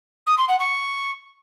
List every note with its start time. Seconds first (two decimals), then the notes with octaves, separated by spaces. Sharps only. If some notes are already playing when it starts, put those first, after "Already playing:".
0.26 D#6
0.37 C6
0.48 F#5
0.59 C#6